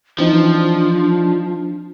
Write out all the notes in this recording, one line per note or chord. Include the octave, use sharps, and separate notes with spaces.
E3 F3 C4 D4 D#4